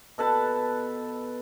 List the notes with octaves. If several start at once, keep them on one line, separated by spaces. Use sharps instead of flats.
B2 A4 B4 A5